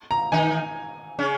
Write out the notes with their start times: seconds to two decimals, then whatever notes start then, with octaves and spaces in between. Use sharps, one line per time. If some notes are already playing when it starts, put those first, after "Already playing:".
0.11 A#5
0.32 D#3 D#4 G#5
1.19 C#3 C#4